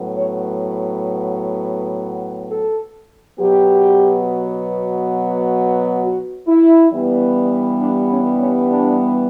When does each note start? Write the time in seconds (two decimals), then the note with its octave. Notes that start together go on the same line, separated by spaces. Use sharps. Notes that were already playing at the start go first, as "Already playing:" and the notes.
Already playing: A2 F#3 B3
0.17 C#5
2.51 A4
3.39 B2 F#3 B3 G4
6.04 F#4
6.48 E4
6.92 G2 E3 G3 B3
7.80 D4
8.09 C#4
8.38 C#4
8.68 D4